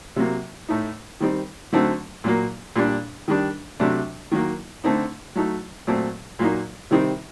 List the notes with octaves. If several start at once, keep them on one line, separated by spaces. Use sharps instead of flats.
C3 F#3 A#3
A2 A3 D#4
D#3 G3 C4 D#4
D3 F#3 A3 C4 D#4
A#2 F#3 A#3
A#2 G3 D4
D#3 G3 D4
C3 F#3 A3 D4
D#3 F#3 A#3
D3 A3 C4 D#4
F#3 A3 D#4
A#2 F#3 A3 C4
A#2 F#3 A#3 D#4
C3 D#3 G3 C4 D#4